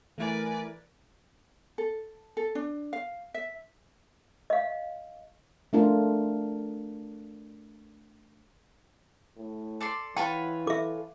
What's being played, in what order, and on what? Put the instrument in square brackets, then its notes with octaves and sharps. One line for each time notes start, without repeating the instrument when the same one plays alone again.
[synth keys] E3 [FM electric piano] A3 E4 G#5 [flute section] A#4 [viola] B4 D5
[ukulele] A4
A4
D4
F5
E5
[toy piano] D#5 F5
[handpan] A3 D4 F4 A#4
[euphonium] A2
[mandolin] A4 D5 C6
[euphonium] E3 [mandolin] F4 B4 C#5 [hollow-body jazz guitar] F#5 [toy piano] G5 A5
[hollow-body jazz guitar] A4 [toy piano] E5 D6